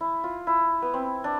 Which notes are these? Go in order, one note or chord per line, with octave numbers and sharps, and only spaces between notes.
E4
F4
E4
B3
C4
D4